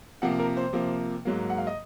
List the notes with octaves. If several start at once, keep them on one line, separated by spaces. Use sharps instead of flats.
C3 F3 A#3 F#5
A#4
C5
C3 F3 A#3
G#2 F#3 A#3
F#5
F5
D#5